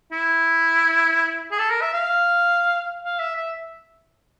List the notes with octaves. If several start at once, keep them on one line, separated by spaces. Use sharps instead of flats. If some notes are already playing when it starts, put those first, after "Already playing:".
E4
G#4
A4
A#4
E5
F5
F5
E5
E5